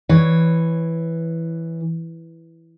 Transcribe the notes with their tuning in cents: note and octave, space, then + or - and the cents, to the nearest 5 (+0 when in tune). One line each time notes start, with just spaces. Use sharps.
E3 +0 C#5 +0